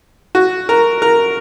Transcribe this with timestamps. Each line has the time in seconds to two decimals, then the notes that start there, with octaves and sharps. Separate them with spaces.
0.35 F#4
0.69 A#4
1.02 A#4